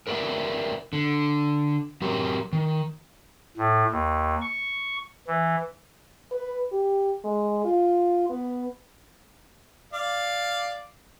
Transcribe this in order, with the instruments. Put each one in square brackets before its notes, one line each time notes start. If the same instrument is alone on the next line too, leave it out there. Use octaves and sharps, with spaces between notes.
[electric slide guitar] A#4 B4 D5 E5 F#5
D3
F#3 G4 A#4
D#3
[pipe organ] A2
D#2
C#6
E3
[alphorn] B4
G4
G#3
F4
B3
[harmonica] D5 F5